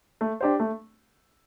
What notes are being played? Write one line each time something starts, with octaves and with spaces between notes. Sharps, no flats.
A3
D4 G4 C5
A3